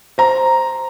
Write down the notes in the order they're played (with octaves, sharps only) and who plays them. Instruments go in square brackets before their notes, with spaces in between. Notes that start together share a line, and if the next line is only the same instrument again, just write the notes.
[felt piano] C5 A#5